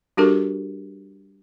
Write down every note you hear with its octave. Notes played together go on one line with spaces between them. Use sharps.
G3 D4 F#4 G4 A4 A#4